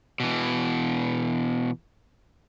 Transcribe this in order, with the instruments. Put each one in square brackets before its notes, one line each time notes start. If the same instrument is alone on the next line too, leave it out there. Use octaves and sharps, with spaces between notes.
[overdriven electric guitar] B2 E3